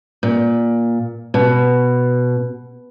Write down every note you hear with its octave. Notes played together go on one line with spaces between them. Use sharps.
A#2
B2